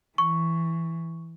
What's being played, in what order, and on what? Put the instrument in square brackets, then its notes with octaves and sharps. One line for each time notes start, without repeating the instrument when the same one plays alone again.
[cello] E3 [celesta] C#6